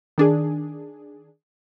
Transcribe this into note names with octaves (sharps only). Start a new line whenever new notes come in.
D#3 D4 G#4